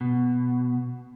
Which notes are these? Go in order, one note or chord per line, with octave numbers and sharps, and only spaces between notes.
B2